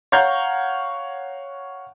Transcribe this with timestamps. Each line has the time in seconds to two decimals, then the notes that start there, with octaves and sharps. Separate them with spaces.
0.12 C#5 F5 F#5 A#5 C#6 G6